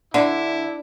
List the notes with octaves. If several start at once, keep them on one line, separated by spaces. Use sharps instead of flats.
D3 D4 E4